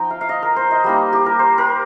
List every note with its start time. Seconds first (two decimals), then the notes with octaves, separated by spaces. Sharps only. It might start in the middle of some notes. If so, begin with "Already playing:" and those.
Already playing: F3 D#4 G5 A#5
0.11 F5
0.21 F5
0.29 D#5
0.42 A#4
0.56 C5
0.71 D#5
0.84 G3 A#3 D#4
1.13 G4
1.26 A#4
1.39 C5
1.58 A#4